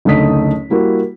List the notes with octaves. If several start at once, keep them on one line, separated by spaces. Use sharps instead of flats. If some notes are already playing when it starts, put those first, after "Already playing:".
F#1 D2 A3 D#4 D#6 B6
G3 A#3 E4 F#4